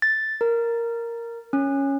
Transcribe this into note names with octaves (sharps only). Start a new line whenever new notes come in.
A6
A#4
C#4